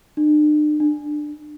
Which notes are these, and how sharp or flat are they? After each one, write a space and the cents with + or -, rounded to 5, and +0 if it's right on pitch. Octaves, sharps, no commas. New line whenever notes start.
D4 +45
D4 +20